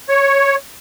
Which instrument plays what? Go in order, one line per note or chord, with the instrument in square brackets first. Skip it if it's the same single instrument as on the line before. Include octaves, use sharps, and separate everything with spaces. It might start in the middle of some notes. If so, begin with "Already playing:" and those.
[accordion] C#5